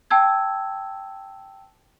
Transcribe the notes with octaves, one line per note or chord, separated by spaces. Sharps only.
G5 A5 E6 G#6